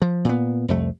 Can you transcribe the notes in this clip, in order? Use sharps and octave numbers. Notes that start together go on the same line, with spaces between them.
F3
A#2 B3
C2 F2 A3